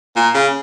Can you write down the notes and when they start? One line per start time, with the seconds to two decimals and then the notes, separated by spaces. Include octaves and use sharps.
0.16 A#2
0.34 C#3